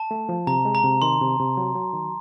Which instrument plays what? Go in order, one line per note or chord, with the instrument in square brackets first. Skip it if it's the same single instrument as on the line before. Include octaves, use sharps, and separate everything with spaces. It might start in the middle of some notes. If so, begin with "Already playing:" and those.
Already playing: [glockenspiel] A5
[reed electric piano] A3
F3
[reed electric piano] C3 [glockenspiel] A#5
[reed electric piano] G#3
[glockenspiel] A#5
[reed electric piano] C3
[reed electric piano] D#3 [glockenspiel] C6
[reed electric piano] C3
C3
F#3
F#3
D#3